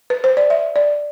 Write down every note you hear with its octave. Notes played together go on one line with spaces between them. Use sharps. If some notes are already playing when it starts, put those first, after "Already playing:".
B4
C5
D5
E5
D5